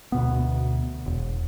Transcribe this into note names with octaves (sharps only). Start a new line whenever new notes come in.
D2 B2 B3
E1